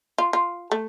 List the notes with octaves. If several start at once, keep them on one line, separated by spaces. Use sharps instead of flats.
F4
F4
A3